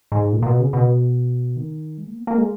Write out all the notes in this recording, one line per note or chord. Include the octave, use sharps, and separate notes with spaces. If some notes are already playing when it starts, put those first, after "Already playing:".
G#2
A#2
A#2
B2
C#3
B2
D#3
G#3
A#3
B3
A#3
G#3